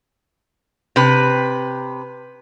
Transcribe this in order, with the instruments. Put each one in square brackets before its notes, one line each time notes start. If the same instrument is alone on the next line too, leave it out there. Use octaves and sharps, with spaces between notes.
[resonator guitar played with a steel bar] C3 B4